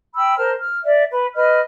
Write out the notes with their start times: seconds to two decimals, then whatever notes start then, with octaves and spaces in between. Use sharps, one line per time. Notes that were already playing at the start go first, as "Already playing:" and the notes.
0.15 G5 B5 E6
0.37 A#4 C5 A5 F6
0.59 F6
0.83 D5 E5
1.09 B4
1.34 B4 D#5 F6